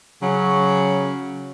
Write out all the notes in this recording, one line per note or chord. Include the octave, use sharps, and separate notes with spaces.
C#3 F#3